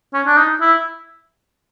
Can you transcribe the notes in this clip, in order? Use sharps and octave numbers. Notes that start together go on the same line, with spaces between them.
C#4
D4
D#4
E4